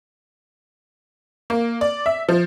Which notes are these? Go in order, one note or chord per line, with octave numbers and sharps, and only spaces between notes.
A#3
D5
E5
F3